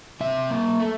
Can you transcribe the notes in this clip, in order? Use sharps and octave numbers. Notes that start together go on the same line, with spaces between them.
C3 E5
A#3
A3